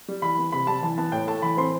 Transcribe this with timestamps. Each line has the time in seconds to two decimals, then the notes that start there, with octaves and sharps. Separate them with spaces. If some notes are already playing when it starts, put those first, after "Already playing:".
0.08 G3
0.22 E3 B5
0.38 B3
0.52 C3 B5
0.67 G3 A5
0.82 E3 A5
0.98 B3 A5
1.12 A2 G5
1.27 A3 A5
1.42 E3 B5
1.57 C4 C6